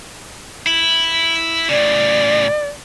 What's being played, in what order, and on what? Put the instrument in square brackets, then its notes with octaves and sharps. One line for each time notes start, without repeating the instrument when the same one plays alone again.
[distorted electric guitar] E4
[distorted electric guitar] A2 C#3 [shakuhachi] D5